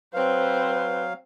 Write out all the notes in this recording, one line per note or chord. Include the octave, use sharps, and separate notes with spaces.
F#3 C4 B4 C5 F5